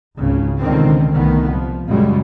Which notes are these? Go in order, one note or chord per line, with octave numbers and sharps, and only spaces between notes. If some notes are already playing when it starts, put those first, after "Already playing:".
G#1 C#2 C#3
C#2 B2 D3 D#3 C4
C2 D#3 A3 B3
F3
F#2 A#2 C#3 G3 G#3